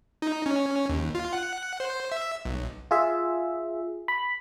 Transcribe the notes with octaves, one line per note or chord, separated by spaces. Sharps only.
D#4
C#4
D#2
F4
F#5
C5
E5
B1
F4 G#4 E5
B5